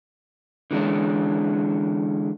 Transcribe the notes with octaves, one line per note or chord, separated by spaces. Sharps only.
D3 E3 G#3 C#4 D4